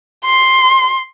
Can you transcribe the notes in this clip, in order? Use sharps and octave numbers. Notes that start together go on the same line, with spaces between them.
C6